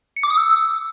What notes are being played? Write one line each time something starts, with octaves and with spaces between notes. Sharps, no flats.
C#7
D6
D#6
E6